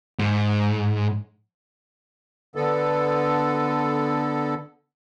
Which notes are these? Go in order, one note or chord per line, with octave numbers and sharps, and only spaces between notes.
G#2
D3 B3 A4